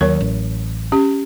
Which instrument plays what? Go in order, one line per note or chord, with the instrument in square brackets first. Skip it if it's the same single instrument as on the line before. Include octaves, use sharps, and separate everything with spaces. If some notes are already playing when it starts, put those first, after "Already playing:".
[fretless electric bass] D#2 [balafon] F#3 A#4 C#5
[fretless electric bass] A1
[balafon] C#4 G4